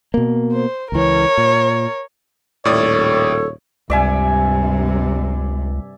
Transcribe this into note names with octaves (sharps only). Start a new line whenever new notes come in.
B2 A#3
C5
C#2 E3 A#4 C#5
A#2
D#1 A2 A4 C#5 D5 D#6
C#2 G2 C3 D5 E5 G#5